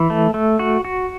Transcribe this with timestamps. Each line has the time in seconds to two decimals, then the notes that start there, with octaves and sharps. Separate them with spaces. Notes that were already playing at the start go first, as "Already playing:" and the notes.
Already playing: E3
0.10 A3
0.34 A3
0.59 F#4
0.85 F#4